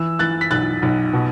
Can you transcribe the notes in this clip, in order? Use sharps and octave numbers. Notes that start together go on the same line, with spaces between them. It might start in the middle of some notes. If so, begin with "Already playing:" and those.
Already playing: E3 E6
E3 F#6 A6
B6
B1 F#6 A6
B1
B2